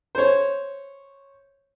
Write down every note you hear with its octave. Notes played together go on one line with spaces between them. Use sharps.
C5 C#5